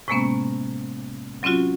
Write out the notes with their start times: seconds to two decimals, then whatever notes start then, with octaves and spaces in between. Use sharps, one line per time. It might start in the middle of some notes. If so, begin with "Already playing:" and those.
0.08 A2 C3 G#3 A#3 B3 C#4
1.43 F#3 C4 C#4 F4 F#4